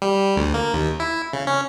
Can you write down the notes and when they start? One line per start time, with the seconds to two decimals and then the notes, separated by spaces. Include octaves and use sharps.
0.02 G3
0.37 D2
0.54 A#3
0.73 D#2
1.00 E4
1.33 C#3
1.47 C#4